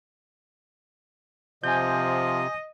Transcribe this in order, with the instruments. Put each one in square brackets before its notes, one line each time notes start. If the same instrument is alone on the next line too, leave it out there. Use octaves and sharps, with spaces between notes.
[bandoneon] C3 [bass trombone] F3 [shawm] D#5 [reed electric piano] G#5 G6